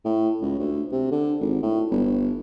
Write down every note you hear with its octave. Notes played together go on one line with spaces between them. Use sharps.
A2
C#2
D2
C3
D3
G#1
A2
G1